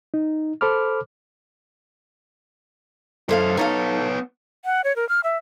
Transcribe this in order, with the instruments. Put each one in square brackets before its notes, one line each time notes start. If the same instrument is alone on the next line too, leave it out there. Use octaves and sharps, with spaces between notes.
[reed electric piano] D#4
A4 C5 B5 D6 F6
[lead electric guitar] F#2 C5 [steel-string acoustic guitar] E4 A4 F5
[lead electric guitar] B3 C#5 [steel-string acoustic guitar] D#4 A4 F5
[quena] F#5
C#5
A#4
F6
E5